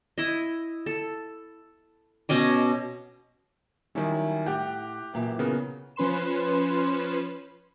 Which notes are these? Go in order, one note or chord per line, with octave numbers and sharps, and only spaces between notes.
E4 D#5
A4
B2 C#4 D#5 D6
D#3 F#3 G3 C#4 E4
A2 G4 F#5 G5
F#2 A#2 E3
C#3 B3 A#4
F3 C#4 B4 C6 E7